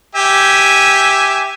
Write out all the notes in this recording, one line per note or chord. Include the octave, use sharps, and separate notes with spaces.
G4 E5 G#5